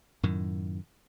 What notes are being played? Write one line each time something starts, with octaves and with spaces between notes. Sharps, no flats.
F#2 A2 D#3